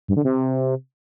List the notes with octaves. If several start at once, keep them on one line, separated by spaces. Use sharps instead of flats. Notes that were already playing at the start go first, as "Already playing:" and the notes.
G2
D3
C3